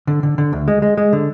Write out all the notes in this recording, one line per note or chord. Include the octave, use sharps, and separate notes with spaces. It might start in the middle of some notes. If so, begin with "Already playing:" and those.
D3
D3
D3
D2
G#3
G#3
G#3
D3